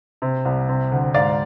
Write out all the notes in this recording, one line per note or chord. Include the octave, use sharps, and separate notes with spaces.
C3
C2
C3
D2
G#2 D5 F5